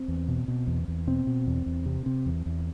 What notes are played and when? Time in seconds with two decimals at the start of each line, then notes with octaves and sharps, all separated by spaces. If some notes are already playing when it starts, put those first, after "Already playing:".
Already playing: C4
0.08 E2
0.28 B2
0.48 B2
0.67 E2
0.88 E2
1.07 B2 C4
1.27 B2
1.47 E2
1.66 E2
1.86 C3
2.06 C3
2.26 E2
2.46 E2